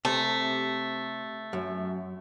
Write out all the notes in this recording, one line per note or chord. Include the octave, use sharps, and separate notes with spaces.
C3 A3
F#2